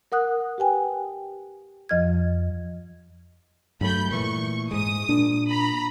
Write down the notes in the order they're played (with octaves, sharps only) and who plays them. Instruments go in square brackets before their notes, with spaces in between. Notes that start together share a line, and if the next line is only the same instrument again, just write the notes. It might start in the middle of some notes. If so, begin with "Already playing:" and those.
[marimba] A#4 F#5 D#6 F#6
G4 B4 G5 G#5
F2 F3 D#5 F6 G#6
[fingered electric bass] G2 F#3 A3 [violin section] B5 G6
[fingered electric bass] A#2 E3 A3 [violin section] C#6
[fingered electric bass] G#2 G#3 [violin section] D#6
[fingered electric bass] A#2 [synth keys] D4
[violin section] A#5 B5